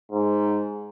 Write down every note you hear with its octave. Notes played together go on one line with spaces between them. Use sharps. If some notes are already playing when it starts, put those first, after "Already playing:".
G#2